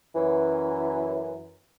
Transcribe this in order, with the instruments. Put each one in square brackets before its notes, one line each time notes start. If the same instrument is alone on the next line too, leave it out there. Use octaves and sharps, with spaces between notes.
[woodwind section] F#2 E3